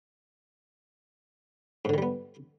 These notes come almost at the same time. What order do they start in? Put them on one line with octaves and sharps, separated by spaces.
G#2 D3 D#3 G3 B3